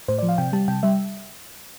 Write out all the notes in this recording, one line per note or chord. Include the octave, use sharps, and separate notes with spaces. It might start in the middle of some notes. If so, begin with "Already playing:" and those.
A2 C5
D5
F3
F5
C3 G5
G3 A5
C3 G5
G3 E5